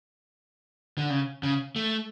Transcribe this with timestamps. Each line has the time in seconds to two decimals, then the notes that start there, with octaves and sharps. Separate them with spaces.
0.98 D3
1.10 C#3
1.43 C#3
1.76 A3